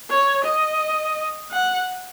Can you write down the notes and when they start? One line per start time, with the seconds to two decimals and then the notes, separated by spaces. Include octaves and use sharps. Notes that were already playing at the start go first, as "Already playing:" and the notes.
0.10 C#5
0.45 D#5
1.52 F#5